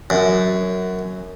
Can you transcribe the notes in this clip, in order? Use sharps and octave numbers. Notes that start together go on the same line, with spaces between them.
F#2